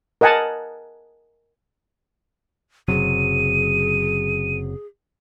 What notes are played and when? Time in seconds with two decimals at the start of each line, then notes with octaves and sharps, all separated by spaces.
0.21 A#4 D#5 F#5 G#5 A5
2.88 F#1 C3 F#3 G#4 D#7